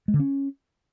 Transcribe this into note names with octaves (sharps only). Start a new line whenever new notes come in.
G#3
D3
C#4